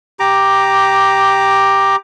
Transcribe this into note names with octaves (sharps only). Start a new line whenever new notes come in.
G4 A#5 D6